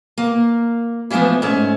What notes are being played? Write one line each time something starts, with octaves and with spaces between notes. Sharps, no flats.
A#3
E3 F3 G#3 A3 B3
G#2 A3 C#4